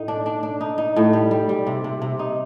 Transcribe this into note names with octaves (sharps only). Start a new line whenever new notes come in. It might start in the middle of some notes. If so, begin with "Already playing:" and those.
Already playing: A2 D#4
D4
D4
D4
D#4
D#4
A2
G3
G3
G3
C3
C3
C3
D#4